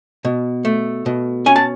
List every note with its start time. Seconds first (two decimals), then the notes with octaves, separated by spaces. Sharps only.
0.25 B2
0.65 A3
1.06 B2
1.46 C#4 G#5
1.56 A5